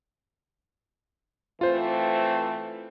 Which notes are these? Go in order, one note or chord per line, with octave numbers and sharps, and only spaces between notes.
E3 A3 C4 F4 C5